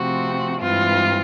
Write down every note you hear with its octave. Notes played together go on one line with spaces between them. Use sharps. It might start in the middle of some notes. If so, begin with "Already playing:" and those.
Already playing: C3 F3 A3 C4 F#4
G2 E3 G#3 C4 F4